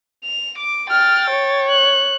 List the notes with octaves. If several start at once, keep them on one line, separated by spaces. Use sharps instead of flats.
F7
D6
G5 F6 A6
C#5
F#6